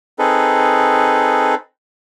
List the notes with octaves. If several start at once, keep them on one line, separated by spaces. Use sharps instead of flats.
C4 D#4 G#4 A4 B4